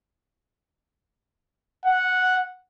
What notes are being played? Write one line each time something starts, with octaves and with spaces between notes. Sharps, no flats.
F#5